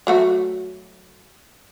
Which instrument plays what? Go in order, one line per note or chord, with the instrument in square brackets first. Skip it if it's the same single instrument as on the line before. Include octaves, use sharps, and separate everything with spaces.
[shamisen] F#3 A3 F#4